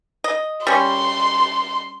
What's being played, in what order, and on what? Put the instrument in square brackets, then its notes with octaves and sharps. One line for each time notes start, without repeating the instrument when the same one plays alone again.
[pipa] D#5
[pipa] G3 C#4 [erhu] C6